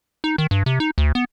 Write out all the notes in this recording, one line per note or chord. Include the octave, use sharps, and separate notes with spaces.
D#4
D#3
G2
C3
D#4
D2
B3